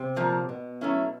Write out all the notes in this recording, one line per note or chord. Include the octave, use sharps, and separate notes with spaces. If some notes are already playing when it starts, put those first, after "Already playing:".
Already playing: C3
A#2 F3 A#3
B2
F#3 A3 C#4 E4